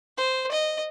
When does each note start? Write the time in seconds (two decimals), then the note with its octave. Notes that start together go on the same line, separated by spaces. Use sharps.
0.17 C5
0.51 D#5